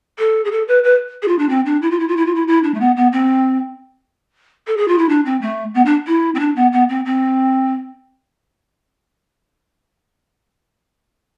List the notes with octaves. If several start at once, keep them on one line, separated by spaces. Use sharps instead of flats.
A4
G#4
A4
B4
B4
G#4
F4
D4
C4
D4
E4
F4
E4
F4
E4
F4
E4
E4
D4
A3
B3
B3
C4
A4
G#4
F4
E4
D4
C4
A3
B3
D4
E4
C4
D4
B3
B3
C4
C4